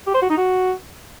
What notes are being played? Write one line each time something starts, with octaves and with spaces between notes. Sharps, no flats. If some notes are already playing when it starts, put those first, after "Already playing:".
G4
C5
F#4
D#4
F#4